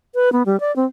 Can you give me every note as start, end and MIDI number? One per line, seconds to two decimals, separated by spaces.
0.15 0.32 71
0.32 0.43 59
0.46 0.59 55
0.60 0.74 74
0.76 0.85 60